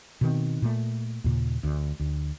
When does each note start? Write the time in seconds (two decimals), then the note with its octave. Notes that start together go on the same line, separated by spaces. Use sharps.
0.21 B2 D#3 C4
0.62 A#2 A3
1.24 D#2 A#2 C#3
1.63 D2
2.00 D2